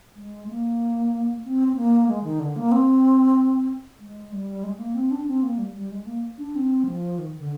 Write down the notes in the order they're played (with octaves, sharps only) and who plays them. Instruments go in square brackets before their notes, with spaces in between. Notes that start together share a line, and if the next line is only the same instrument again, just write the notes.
[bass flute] G#3
A#3
C4
C4
A#3
G#3
D#3
D3
A#3
C4
G#3
G3
G#3
A#3
C4
D4
C4
A#3
G3
G3
G#3
A#3
D4
C4
F3
D#3
D3